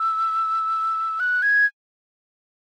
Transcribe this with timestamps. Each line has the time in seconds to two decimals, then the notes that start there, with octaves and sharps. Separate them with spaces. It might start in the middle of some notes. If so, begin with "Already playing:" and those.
Already playing: E6
1.20 F#6
1.42 G#6